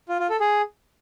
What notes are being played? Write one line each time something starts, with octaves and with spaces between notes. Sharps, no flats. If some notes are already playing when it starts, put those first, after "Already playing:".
F4
F4
A4
G#4